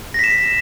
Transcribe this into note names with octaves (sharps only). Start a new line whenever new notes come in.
A#6 B6 E7